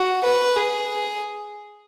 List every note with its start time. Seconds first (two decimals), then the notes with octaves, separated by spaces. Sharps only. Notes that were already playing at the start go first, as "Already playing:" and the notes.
Already playing: F#4
0.24 B4
0.56 G#4